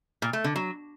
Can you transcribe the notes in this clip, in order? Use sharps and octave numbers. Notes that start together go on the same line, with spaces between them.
A#2
A3
D3
F#3